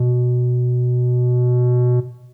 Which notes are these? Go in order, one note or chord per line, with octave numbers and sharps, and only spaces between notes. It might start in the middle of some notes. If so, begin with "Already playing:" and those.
Already playing: B2